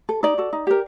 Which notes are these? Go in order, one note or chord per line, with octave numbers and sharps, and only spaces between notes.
A4
D#4 D5
F#4 A4
D#4
G4 A#4